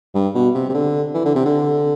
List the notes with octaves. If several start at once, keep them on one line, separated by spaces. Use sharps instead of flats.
G2
B2
C3
C3
D3
E3
D3
C3
D3